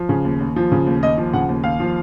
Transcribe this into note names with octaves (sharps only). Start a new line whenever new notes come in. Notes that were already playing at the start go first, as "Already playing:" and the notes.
Already playing: F3
C#3
D#2
D#2
F3
C#3
D#2
D#2 D#5
F3
C#3 F#5
D#2
D#2 F5
F3